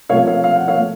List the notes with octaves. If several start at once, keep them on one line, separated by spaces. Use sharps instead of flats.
C3 F3 A3 C#5 F5
C#5 F5
F5
F#5
C#5 F5
A3